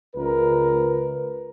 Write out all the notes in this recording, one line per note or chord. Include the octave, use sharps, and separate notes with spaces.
C#2 A#4 B4